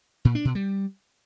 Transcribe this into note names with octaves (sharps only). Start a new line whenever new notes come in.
A#2
D4
B2
G3